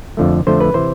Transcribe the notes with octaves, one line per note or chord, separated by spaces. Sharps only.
F2 D3 F3 A3
F2 D3 F3 A3 C5
B4
C3 E3 C5